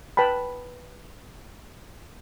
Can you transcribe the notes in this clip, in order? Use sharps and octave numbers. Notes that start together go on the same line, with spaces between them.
B4 G5 A5 B5